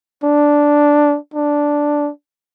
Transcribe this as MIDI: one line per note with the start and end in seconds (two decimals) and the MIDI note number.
0.23 1.17 62
1.34 2.11 62